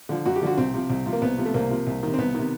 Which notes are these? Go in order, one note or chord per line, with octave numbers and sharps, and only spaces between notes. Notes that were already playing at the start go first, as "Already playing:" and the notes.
D3 F3
F#2 F#4
G4
D3 F3 F#4
C2 C4
C3 F3
C2
C3 F3
A#3
C2 B3
C3 F3
A3
C2 A#3
C3 F3
C2
C3 D#3
C4
C2 B3
C3 D#3